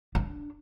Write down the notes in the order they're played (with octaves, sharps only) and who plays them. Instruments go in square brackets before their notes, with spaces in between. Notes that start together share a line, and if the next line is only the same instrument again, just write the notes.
[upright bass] D4